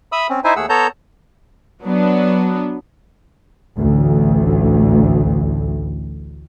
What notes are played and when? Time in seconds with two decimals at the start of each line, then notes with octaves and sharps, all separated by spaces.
0.12 E5 B5 D#6 E6
0.29 C4 C#4
0.44 D#4 E4 C5 E5 G#5
0.56 D#2 A3 G#4 F#5 E6
0.69 B3 A4 C#5 A5 A#5 G6
1.82 F#3 B3 D4
3.77 A1 D2